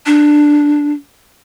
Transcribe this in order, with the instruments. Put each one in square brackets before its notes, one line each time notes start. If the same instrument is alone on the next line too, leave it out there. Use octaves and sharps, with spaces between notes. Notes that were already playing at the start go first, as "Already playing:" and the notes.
[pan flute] D4